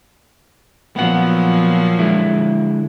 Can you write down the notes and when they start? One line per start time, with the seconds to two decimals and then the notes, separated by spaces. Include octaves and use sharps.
0.96 A#2 F3 F#3 B3 F#5
1.99 D3 G#3 E4